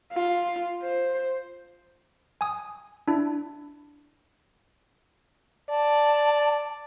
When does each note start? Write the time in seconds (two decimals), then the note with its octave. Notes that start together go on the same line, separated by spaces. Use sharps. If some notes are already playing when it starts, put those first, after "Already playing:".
0.13 F4
0.83 C5
2.41 G#5 D#6
3.08 D4 E4
5.70 D5 A5